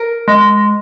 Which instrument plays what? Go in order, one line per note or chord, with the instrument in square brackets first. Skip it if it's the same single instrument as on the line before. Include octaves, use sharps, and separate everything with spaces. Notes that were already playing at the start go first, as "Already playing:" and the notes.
Already playing: [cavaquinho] A#4
[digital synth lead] G#3